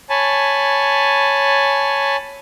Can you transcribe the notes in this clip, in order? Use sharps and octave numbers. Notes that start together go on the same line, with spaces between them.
C#5 G#5 A5 B5